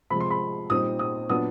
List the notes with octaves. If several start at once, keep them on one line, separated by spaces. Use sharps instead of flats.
C3 F3 G#3 B5
C6
B5
A#2 G3 C4 D#4 D#6
D#6
A#2 F#3 B3 D4 D#6